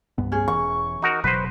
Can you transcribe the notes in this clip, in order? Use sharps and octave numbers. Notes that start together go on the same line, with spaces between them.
C2 G2 B3
C#4 G#4
E1 E3 C#6
D#4 F#4 A#4
E1 B2 F#3 B4 C5